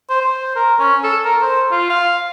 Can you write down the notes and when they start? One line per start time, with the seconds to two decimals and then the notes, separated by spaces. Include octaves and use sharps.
0.09 C5
0.21 C5
0.56 A#4
0.79 C#4
1.04 A4
1.25 A#4
1.42 C5
1.71 F4
1.90 F5